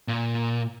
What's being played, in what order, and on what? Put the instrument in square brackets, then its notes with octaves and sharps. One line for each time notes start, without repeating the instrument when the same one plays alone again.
[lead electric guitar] A#2